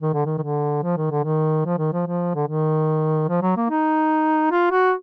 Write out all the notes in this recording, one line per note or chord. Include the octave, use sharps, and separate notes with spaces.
D#3
D3
D#3
D#3
D3
F3
D#3
D3
D#3
F3
D#3
F3
F3
D3
D#3
F3
F#3
A#3
D#4
F4
F#4